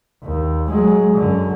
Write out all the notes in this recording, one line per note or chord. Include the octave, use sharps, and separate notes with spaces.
D#2
F#3 G#3
F#2 D3